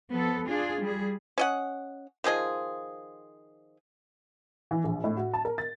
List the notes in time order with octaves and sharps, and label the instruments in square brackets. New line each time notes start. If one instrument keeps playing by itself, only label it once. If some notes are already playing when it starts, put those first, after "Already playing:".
[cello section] F3 B3 A4
D4 F4 G#4
G3 G#4
[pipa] C#4 D#5 F#5
D#3 F3 G#4 D#5
[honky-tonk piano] E3
A#1
A2
F#4
A5
A#4
A6